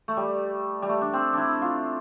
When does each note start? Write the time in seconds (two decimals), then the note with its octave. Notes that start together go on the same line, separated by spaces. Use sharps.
0.08 A3
0.17 G3
0.82 G3
0.89 A3
1.01 D4
1.13 C4
1.33 D4 E4
1.62 F4